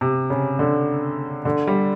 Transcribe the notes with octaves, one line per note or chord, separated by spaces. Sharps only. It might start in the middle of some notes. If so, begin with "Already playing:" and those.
C3
C#3
D3
D3
G3